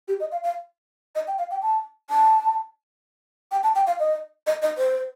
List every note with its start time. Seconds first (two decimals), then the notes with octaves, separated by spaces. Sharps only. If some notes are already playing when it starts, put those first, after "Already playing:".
0.08 G4
0.20 D#5
0.32 F5
0.44 F5
1.15 D#5
1.28 G5
1.38 F5
1.51 G5
1.62 A5
2.10 A5
3.52 G5
3.63 A5
3.75 G5
3.87 F5
4.00 D#5
4.47 D#5
4.62 D#5
4.78 C5